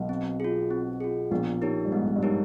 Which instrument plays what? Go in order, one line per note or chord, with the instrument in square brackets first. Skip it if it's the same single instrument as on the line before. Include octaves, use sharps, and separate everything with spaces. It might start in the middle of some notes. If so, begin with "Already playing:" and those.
Already playing: [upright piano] B1 B2
[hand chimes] C4
F4 G#4
C4
F4 G#4
[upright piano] A#1 A#2 [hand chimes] B3
[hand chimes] D#4 G4 A#4 C#5
[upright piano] G2
[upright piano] G#2 [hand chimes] B3
[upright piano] G#2
G2
[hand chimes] D#4 G4 A#4 C#5